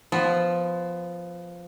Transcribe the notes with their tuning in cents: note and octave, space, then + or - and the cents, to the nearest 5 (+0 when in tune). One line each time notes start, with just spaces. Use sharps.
F3 +0 B3 +20